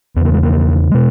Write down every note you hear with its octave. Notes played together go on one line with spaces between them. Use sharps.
E2 C#3 A#3 B3
G#3
A#3
B2 G#3